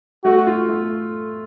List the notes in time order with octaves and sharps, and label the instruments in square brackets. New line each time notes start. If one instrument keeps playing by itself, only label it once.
[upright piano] A3 [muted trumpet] F#4
[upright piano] F4
A3